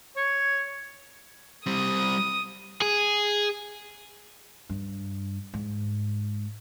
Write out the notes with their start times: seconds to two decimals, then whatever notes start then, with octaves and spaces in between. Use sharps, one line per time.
0.16 C#5
1.66 G3 C4 D#6
2.82 G#4
4.70 G2
5.54 G#2